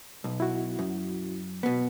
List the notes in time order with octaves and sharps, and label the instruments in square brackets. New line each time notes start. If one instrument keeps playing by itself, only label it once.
[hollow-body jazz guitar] B1
[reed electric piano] E4 F#4
[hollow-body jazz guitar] F#2
B2 B3